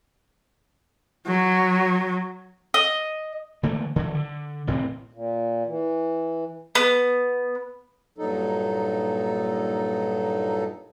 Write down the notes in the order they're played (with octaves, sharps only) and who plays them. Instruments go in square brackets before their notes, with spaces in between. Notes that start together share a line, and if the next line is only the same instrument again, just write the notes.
[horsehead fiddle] F#3
[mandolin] D#5
[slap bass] D3 E3 A3 A#3
D3 E3 F#3
D3
A1 A2 C3 C4
[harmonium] A#2
E3
[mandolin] B3
[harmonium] G2 A#2 F#3 D#4 A4